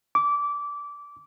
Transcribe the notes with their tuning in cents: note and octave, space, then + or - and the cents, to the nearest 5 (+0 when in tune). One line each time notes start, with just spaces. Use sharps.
D6 -20